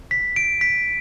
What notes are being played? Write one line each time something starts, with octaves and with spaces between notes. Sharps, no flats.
B6
D7
B6